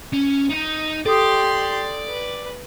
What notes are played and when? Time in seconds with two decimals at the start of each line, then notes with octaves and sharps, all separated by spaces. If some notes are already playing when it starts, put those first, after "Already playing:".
0.13 C#4
0.49 D#4 D#5
1.06 G4 A4 D5 C6 D#6
2.08 B4